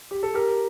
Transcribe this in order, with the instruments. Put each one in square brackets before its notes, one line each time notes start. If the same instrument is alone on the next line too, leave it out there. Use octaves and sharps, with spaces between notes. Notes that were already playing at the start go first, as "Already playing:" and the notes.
[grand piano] G4
A4
G4 A#4